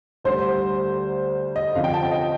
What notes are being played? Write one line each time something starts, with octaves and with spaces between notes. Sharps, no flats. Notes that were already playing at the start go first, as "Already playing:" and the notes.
D2 D3 G3 C5
D#5
F2 D3 F3 F5
G5
A5
G5
D#5